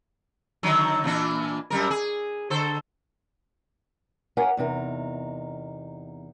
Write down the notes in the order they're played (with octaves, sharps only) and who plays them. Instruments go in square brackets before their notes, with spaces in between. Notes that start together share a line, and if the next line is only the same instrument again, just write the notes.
[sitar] D3 D#3 F#3
A#2 E3 D4
F#2 G3 A#4
G#4
D3 A4 C5
[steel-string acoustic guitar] G4 A#4 C#5 F5 F#5 G#5
E2 C3 D#4 A4 A#4